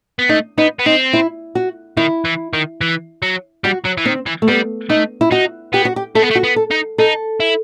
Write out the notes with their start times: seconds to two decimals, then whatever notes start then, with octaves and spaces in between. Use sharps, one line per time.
0.19 B3
0.29 A3 D#4
0.58 B3 D#4
0.79 B3
0.86 C4 D#4
1.13 E4
1.55 F#4
1.97 D#3 E4
2.25 E3
2.53 D#3
2.81 E3
3.22 F#3
3.64 G3 F#4
3.85 F#3
3.98 E3
4.05 D#3 C4
4.27 E3
4.42 A3
4.48 G3 B3
4.90 A3 D#4
5.21 E4
5.32 D#4 F#4
5.73 B3 G4
5.85 F#4
5.96 G4
6.15 A3 A4
6.22 B3
6.31 A3
6.35 F#4
6.44 B3
6.56 A4
6.71 D#4
6.98 D#4 A4
7.40 E4